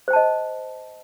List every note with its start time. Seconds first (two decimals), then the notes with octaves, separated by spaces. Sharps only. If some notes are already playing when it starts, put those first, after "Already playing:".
0.08 C5
0.11 G5
0.13 A5
0.16 D#5